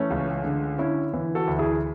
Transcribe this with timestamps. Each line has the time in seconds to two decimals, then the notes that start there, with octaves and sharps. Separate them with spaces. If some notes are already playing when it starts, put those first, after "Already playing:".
Already playing: E3 A3 C#4
0.10 C#2
0.44 D3
0.78 D3 C#4 E4
1.13 E3
1.35 F#4 A4
1.47 D2
1.59 E4 G#4